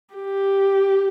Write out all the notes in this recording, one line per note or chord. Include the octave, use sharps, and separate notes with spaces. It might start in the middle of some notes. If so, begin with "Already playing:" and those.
G4